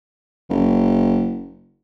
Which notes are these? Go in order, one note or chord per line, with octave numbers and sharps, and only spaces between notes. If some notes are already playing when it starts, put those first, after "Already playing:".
F#1